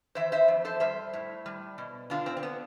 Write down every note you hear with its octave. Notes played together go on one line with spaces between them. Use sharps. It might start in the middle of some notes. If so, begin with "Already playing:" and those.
E3 C5 E5
C5 E5
F2
A4 C5
G3 C5 E5
A2
G3
B2
D3 D4 F4
C4
C4
B3